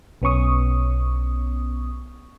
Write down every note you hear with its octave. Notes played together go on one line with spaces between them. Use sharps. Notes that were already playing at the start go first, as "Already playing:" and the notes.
B1 B3 C#4 C#6 D#6